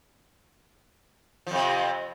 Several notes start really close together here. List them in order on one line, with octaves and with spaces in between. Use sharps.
F3 F2 C3